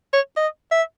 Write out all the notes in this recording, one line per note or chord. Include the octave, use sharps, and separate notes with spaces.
C#5
D#5
E5